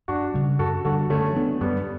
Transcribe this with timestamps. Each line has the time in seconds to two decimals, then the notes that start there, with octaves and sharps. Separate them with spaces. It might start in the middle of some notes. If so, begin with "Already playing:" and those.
0.08 F#2 D4 F#4
0.34 C#3 G3
0.59 F#2 F#4 A4
0.85 D3 G3 D4 F#4 A4
1.10 D3 A3 C#4
1.36 F#3 B3 D4
1.61 F#2 G3 B3